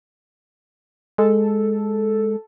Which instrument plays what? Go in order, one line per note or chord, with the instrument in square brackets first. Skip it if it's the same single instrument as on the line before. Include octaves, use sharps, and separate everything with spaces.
[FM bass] G#3 [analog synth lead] A4